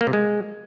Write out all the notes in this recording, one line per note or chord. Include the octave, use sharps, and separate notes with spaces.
A#3
C3
G#3